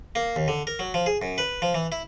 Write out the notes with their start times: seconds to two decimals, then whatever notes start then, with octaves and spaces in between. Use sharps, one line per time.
0.15 A#3
0.36 D#2
0.48 D3
0.67 A#4
0.79 F#3
0.94 F3
1.06 G#4
1.22 F#2
1.38 B4
1.62 F3
1.74 E3
1.92 E4